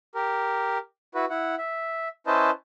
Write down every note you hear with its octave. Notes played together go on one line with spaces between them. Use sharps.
G4 A#4
E4 F#4 B4
E4 F#5
E5
C#4 E4 B4 C5 D#5 A5